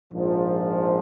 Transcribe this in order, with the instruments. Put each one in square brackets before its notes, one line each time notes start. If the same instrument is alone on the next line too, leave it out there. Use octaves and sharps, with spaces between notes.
[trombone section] A#1 G#2 F3